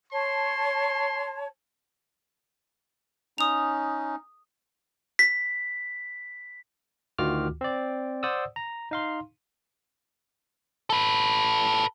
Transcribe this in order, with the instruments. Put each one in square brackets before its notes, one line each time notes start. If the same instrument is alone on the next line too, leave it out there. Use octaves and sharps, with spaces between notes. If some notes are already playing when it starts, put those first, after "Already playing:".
[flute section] C#5 A5 [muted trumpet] C6
[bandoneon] C#4 D#4 [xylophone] D#6 F7
[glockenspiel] B6
[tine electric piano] D2 D#3 F4 F#4 D6 F6
C4 D5
C5 D5 F#5 D#6 E6
A#5
D#4 F5 C6
[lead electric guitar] A4 B4